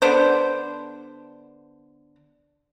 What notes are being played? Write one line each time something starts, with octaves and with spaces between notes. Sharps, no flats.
D3 B3 D4 C5